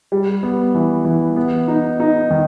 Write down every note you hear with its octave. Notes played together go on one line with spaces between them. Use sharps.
G3
B3
E3
E3
B3
D#4
D#4
D#3